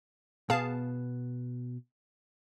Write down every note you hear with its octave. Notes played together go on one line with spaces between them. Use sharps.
B2 B3 G#4 F5 A5